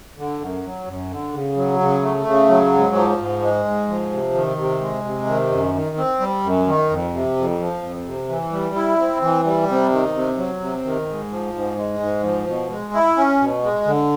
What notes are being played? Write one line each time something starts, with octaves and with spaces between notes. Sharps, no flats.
D3
F#2
F#3
F#2
D3
C#3
F#3
C#3
A3
C#3
F#3
G#2
F3
G#2
G#3
G#2
F3
C3
D#3
C3
G#3
C3
D#3
F#2
D#3
C4
G3
F#2
D#3
F2
C3
F2
F3
F2
C3
E3
G3
E4
C4
E3
G3
C3
D#3
C3
F#3
C3
D#3
G#2
F3
G#2
G#3
G#2
F3
B2
G#3
E4
C#4
B2
G#3
D3